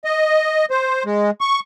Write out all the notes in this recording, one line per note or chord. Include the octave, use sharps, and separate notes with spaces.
D#5
C5
G#3
C#6